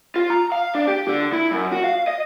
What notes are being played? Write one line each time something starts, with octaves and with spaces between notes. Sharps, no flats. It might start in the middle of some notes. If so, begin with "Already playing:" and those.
F4
A#5
F5
D4
G4
D3
E4
F#2
F#4
F5
D#5